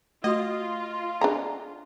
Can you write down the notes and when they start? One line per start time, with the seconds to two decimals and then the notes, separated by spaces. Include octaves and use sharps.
0.24 A3 F4 F#4 D#5
1.21 D4 G#4 A#5